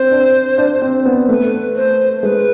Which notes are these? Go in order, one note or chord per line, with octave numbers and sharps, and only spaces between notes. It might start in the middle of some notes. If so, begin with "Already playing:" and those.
Already playing: C4 C5
D4
D4
C4
B3
A3 B4
C5
C5
G#3 B4